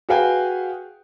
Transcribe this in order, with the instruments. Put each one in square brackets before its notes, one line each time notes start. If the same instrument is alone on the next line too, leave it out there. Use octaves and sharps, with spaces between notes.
[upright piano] F#4 G#4 B4 F5 G5 G#5